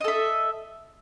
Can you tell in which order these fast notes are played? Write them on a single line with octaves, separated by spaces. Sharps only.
D#5 A4 E5